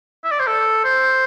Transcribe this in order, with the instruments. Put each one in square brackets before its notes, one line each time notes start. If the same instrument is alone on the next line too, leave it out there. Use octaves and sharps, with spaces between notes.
[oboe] E5
D5
C5
A4
C5